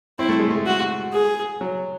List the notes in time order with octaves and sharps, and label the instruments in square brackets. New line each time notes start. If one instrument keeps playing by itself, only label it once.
[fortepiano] C4 [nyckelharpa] E4
[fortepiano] A3
G#3
A3
[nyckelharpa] F#4
G#4
[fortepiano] F#3